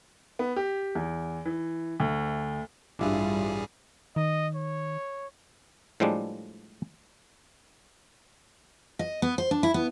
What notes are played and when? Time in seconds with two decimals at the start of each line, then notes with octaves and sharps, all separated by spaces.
0.39 B3
0.56 G4
0.95 E2
1.45 E3
2.00 D2
2.99 A1 G2 G3 D4 E4 F4 G#4
4.16 D#3 D#5
4.55 C#5
6.00 A2 F3 G3 G#3 D4
8.99 D#5
9.22 B3
9.38 C5
9.51 D4
9.63 E4
9.74 B3